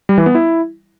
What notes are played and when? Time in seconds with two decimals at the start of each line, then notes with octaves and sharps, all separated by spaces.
0.09 G3
0.18 E3
0.26 B3
0.35 E4